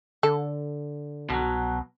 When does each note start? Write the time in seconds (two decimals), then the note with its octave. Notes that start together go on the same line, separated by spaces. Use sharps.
0.23 D3 A4
1.30 C2 B2 F#3